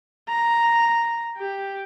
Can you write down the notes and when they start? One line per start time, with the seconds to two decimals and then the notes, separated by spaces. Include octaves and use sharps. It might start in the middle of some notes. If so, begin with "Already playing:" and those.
0.29 A#5
1.38 G4